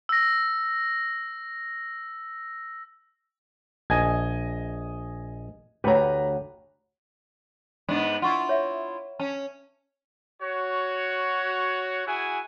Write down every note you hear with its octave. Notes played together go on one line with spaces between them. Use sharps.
E6 A#6
A#1 D#5 G#5 A5 G#6
D2 G4 B4 C#5 F#5 A#5
G#2 B3 D4
E4 F4 F#5 C#6
C#5 E5
C#4 A5
F#4 C#5
E4 F#4 G#4 G#5